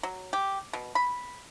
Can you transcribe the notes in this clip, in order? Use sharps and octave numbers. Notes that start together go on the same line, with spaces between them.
F#3
G4
B2
B5